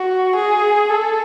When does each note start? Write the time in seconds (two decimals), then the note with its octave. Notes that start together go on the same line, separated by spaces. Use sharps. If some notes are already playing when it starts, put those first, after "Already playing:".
Already playing: F#4
0.35 G#4
0.90 A4